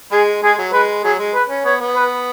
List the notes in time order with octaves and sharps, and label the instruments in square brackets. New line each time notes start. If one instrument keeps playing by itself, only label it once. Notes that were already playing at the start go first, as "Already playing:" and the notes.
[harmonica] G#3 [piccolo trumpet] G#4
[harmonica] G#3 [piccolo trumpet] G#4
[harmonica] F#3
[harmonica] G#3 [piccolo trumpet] B4
[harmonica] F#3 [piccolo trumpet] G#4
[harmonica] G#3
[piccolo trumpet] B4
[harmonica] C#4
[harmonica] B3 [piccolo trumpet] C#5
[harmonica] B3
[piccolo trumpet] B4